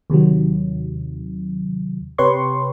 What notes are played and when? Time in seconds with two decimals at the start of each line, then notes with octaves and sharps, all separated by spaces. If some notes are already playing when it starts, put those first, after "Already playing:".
0.10 D#2 C3 D#3 F#3
2.18 C3 G4 B4 C#5 C6 C#6